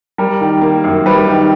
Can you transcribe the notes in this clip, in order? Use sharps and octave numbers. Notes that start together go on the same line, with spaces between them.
G3 A#4
D#3
A#3
F#2
G3 B4
D#3